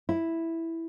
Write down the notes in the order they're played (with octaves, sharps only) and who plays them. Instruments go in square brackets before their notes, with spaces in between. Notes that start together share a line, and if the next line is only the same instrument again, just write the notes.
[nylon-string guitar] E4